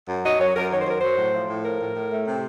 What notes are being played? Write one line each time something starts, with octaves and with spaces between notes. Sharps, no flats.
F#2
F#3 D#5
F#2 C#5
F#2 A#4
D#3 C#5
C5
F#2 A#4
F#3 C5
A2
F3
A2
F3 A#4
A2
A2
A3
C3